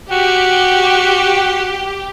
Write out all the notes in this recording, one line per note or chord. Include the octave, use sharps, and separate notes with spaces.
F#4 G4